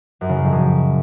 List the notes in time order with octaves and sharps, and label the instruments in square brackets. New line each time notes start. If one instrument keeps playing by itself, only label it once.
[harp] F#2
C#3
A#2
F2
F#2